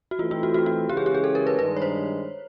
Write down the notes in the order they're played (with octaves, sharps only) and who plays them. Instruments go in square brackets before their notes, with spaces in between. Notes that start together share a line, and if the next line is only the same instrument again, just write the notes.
[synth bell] F#4
[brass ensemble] E3 A3 C4 [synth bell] F4
[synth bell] F4
F#4
F#4
F#4
[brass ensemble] C#3 E3 G#3 C#4 [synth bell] G4
[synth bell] G#4
G4
G#4
A4
A#4
B4
[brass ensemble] G2 D#3 G#3 [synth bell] B4
[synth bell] C#5
C5